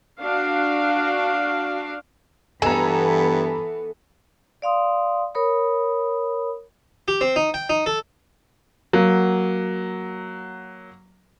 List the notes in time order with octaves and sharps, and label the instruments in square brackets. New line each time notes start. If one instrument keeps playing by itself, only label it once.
[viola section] D4 F#4 F5
[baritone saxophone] G2 [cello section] E3 B3 [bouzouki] A4 [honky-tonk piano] G#5 A#5
[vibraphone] D5 F5 C6 D#6
A#4 C#5 B5 D#6
[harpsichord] G4
C4
D#4
G5
D#4
A4
[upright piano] F#3 A#3